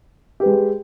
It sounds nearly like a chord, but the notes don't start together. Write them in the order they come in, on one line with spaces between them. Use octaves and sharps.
G4 B4 G#3